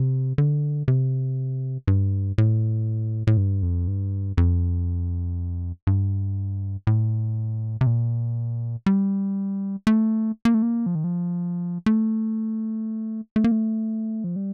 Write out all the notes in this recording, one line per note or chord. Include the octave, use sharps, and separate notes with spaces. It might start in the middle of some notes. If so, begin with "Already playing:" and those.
Already playing: C3
D3
C3
G2
A2
A2
G2
F2
G2
F2
G2
A2
C3
A#2
G3
A3
A#3
A3
A#3
F3
D#3
F3
A3
A3
A#3
A3
F3
G3